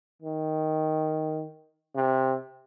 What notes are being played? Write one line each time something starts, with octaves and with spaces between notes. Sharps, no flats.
D#3
C3